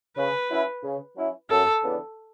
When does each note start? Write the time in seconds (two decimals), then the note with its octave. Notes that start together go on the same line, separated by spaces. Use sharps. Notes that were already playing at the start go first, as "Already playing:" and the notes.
0.17 C#3 B4
0.50 F#3 C#4 E4
0.83 C#3
1.17 F#3 C#4 E4
1.50 F#2 A4
1.83 C#3 E3 B3 D4